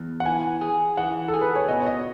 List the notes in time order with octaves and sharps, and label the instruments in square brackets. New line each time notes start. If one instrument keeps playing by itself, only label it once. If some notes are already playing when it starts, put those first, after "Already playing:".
Already playing: [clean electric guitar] E2
[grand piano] F#5
[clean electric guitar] E3 [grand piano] G#5
[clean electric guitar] G#4
[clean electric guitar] E3 [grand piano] F#5
[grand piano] A4
[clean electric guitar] G#4
[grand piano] B4
C#5
[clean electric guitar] B2 [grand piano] D#5
[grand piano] C#5
D#5